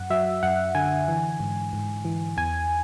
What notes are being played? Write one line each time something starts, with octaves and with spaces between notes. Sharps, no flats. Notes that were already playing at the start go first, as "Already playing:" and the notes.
Already playing: F#2 F#5
F#3 E5
F#2 F#5
D3 G#5
E3
G#2
G#2
E3
E2 G#5